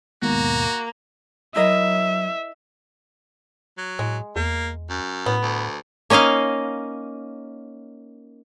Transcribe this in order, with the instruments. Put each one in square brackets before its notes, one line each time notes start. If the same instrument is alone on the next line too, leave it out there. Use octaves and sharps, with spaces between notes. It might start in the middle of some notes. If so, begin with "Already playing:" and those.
[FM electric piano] D#2 G#2 B2 [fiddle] A#3 [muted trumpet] F#4
[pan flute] F#3 [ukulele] E4 A#4 D#5 [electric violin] E5
[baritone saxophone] F#3
[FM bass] A2 [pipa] G#3
[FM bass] E2 [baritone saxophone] A#3
[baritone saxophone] F#2
[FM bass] A2 [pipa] B3
[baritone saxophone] D2
[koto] A#3 C#4 D#4 D#5 F5